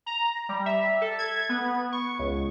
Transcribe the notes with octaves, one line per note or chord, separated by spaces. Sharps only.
A#5
G3
E5
A4
G#6
B3
C#6
C#2